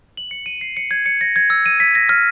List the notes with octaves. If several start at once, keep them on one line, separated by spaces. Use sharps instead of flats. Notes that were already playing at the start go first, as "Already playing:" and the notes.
F#7
C#7
D#7
C7
C#7
G#6
C#7
A#6
G#6
E6
D#7
B6
A#6
F6